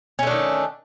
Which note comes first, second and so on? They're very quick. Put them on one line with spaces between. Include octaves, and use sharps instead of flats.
C#4 A3 D4 D#3